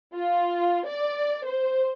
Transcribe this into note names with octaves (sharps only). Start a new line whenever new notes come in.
F4
D5
C5